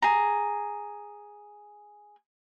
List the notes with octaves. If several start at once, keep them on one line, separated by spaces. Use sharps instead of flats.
G#4 A#5